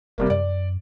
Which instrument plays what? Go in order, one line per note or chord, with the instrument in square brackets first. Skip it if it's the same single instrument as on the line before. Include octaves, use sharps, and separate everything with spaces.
[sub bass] F1 [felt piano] C3 G3 A#3
[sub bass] F#2 [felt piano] D5